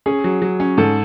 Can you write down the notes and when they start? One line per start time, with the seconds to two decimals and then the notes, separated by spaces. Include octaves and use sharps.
0.06 C#4 G#4
0.24 F#3
0.42 F#3
0.60 C#4
0.78 G#2 A4